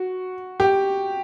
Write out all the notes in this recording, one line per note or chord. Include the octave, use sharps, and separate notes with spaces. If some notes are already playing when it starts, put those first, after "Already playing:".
Already playing: F#4
G4